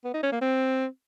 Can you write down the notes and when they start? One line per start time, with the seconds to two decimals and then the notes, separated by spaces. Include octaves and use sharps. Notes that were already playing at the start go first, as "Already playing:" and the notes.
0.05 B3
0.14 D#4
0.23 C#4
0.32 A#3
0.41 C4